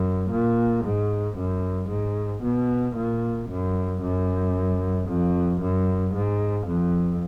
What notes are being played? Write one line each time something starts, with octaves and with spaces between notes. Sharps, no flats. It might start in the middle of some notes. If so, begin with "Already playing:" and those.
Already playing: F#2
A#2
G#2
F#2
G#2
B2
A#2
F#2
F#2
F2
F#2
G#2
F2